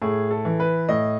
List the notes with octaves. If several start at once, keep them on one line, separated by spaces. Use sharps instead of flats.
A2 G#4
A4
E3
B4
A2 D#5